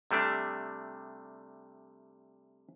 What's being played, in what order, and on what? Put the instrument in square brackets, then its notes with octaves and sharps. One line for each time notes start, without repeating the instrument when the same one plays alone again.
[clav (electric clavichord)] C3 G3 A3 D4